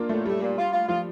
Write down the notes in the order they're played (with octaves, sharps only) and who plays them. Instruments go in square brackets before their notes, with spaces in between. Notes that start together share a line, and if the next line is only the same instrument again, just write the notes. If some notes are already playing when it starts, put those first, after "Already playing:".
Already playing: [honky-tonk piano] A#3 D4 F4
[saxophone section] A2 [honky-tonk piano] A3
[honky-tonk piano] G3 [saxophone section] A3
[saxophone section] A#2
F4
F4
[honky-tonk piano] F3 [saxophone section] F4